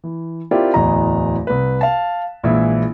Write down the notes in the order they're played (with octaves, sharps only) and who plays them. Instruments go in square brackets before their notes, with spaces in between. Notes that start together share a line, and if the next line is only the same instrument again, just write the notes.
[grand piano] E3
C4 E4 F4 G4 A#4 D5
D1 E2 E3 D#5 A#5
C2 B4
F5 A5
A#1 E3 G#3 E4